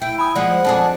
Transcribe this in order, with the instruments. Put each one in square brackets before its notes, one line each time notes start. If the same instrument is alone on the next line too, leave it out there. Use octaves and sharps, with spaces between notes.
[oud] E4 [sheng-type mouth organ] G5
[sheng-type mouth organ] G#5 [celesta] B5 D#6
[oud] F3 G#3 [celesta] D5 [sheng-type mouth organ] F#5
[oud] F2 D4 G#4 [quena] A5